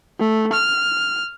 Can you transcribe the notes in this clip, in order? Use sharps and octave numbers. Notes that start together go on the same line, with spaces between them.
A3
F6